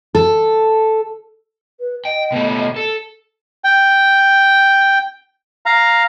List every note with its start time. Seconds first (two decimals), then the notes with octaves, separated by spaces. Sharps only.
0.15 A4
1.80 B4
2.05 D#5 G5
2.32 B2 A3
2.76 A4
3.64 G5
5.66 F5 A#5